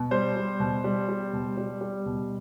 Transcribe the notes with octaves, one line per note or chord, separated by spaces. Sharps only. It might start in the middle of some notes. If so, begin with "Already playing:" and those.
Already playing: B2
G3 C5
G3
B2
G3
G3
B2
G3
G3
B2